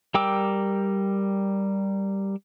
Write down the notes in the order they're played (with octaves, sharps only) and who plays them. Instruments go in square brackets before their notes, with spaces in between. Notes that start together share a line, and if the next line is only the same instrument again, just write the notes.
[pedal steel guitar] G3 A#4 G5 D6 E6